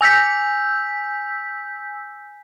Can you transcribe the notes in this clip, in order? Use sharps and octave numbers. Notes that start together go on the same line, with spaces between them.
G#5 E6 G6 B6